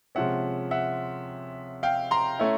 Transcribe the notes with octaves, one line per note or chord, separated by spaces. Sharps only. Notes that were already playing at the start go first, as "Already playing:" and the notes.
C3 F3 G#3 C#4 E5 F#5
E5 F#5
F5 G5
A#5 C6
A3 C#4 E4